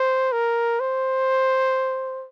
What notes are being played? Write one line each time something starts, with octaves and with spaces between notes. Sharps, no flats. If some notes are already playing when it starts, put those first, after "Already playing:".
Already playing: C5
A#4
C5